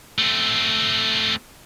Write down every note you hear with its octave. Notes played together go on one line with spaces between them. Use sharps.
A3 C4